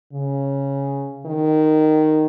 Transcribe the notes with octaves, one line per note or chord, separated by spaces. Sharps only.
C#3
D#3